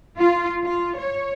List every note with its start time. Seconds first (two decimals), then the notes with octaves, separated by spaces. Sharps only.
0.17 F4
0.64 F4
0.97 C#5